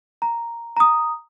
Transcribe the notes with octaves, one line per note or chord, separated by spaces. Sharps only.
A#5
A#5 D#6